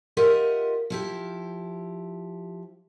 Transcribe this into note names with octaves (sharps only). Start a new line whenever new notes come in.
F4 G4 A#4 D#5 E5 F#5
F3 E4 G4